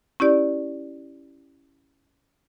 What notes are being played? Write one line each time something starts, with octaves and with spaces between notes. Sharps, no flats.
C#4 E4 G4 D5